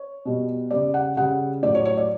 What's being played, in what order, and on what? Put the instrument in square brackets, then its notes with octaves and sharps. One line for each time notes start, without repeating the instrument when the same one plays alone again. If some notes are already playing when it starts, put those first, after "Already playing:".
Already playing: [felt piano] C#5
B2 G3
C#3 G3 D5
F#5
C#3 G3 F#5
A2 D5
F#3
C#5
C#5
D5